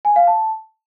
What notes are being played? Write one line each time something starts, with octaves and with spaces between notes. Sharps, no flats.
G#5
F5
A5